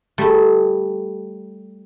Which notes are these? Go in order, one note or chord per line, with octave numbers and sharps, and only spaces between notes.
G3 A3